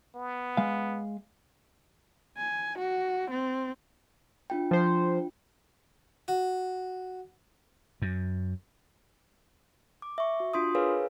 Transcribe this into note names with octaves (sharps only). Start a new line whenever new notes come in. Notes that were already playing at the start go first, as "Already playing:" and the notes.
B3
G#3 F5
G#5
F#4
C4
D4 F4 G5
F3 C5
F#4
F#2
D6
E5 C#6
F#4
D4 F4 C6 D#6
G#4 A#4 B4 C#5 F5 G#5